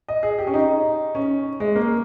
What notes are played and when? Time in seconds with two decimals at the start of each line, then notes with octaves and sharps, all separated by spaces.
0.08 D#5
0.23 G#4
0.38 G4
0.47 C#4
0.54 D#4
1.15 C#4
1.60 G#3
1.76 A#3